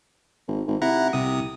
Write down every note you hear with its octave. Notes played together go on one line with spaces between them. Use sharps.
G#1
G#1
C3 E4 F#5 A#5
C2 C3 D#6